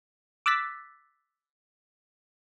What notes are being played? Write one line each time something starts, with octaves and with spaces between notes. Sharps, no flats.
D6 E6 F#6 A6 B6